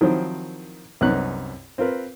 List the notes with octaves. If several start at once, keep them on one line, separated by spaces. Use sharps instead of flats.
D#3 F3 F#3 C4 E4
C2 F#2 B3 C#4 D#4 F#6
C4 F4 A#4 B4